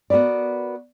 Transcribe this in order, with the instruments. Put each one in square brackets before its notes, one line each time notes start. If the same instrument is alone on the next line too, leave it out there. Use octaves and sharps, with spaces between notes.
[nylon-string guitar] B3 F#4 A#4 B4 D5